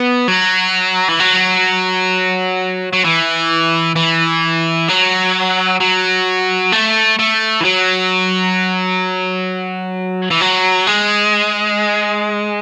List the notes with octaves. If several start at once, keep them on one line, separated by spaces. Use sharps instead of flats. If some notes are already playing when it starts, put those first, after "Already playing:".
Already playing: B3
F#3
E3
F#3
F#3
E3
E3
F#3
F#3
A3
A3
E3
F#3
E3
F#3
G#3